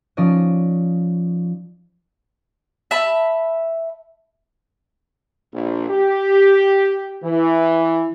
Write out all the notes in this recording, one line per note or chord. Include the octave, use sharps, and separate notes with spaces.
F3 C#4 D#4 D5 D#5
E5 A5 B5
A#1
G4
E3